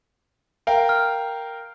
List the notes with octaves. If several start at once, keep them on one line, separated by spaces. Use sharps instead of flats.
A#4 F5 G5
F6